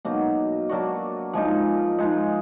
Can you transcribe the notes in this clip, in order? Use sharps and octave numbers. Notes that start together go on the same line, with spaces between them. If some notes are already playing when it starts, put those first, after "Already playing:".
B2 F#3 A#3 D#4
F#3 A#3 D4 F#4
F3 G#3 D#4
F3 G#3 D#4